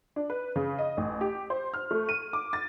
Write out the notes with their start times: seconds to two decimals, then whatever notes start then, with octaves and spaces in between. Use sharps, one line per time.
0.16 D4
0.30 B4
0.56 C#3
0.79 D#5
0.97 A1
1.21 G4
1.50 C5
1.74 F6
1.91 A3
2.09 D#7
2.33 D6
2.53 A6